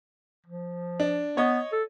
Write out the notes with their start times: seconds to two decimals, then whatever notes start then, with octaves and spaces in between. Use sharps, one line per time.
0.47 F3
1.00 D4
1.37 B3 C#5 D#5
1.73 A4